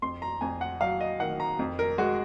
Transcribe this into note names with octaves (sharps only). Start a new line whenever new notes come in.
F2 C6
A#5
F2 G#5
F#5
F#3 F5
D#5
D#3 F#5
A#5
F2
A#4
G#3 F#4